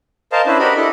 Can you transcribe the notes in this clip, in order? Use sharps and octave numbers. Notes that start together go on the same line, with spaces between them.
A#4 C5 D#5 F5 A5
C#4 D4 E4 B4 C5
F#4 G4 A#4 D#5 B5
D4 E4 A4 D#5